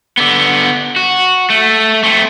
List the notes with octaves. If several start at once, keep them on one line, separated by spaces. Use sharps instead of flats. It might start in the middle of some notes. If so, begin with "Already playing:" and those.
D3 B3
F#4
A3
A3 C4